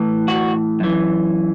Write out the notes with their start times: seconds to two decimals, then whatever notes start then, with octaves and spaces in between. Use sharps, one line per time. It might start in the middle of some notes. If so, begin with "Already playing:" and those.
Already playing: A2 E3
0.28 F#4
0.80 F#2 E3